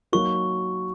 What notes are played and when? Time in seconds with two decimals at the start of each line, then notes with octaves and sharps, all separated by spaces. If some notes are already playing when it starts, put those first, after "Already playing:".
0.12 F#3 A#3 D#4 F#4 A#4 C#6